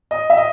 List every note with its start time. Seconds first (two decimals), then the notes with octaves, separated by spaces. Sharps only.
0.11 D#5
0.30 E5
0.37 D#5